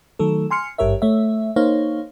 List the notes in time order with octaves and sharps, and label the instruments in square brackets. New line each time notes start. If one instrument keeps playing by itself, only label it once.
[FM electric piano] D#3 F#3 A3 A4
G#5 C6 F6 C#7
G#1 G2 G4 A#4 C#5 E5
A3 C#5 E5
A#3 D#4 C5 C#5 F5